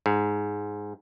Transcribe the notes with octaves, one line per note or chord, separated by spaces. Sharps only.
G#2